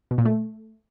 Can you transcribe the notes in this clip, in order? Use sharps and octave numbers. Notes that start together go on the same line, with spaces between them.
B2
A#2
A3